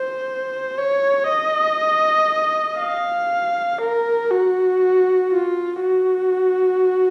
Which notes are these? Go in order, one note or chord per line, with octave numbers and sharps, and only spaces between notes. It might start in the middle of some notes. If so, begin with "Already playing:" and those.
Already playing: C5
C#5
D#5
F5
A#4
F#4
F4
F#4